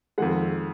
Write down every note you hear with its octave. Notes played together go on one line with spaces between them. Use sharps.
F2 D#3 G#3 F#5